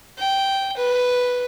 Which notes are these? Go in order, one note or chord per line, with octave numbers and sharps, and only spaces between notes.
G5
B4